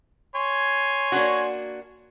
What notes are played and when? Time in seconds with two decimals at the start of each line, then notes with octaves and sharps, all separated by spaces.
0.35 C#5 G#5 C6
1.12 A#3 D4 F#4